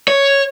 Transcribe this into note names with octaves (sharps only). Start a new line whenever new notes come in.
C#5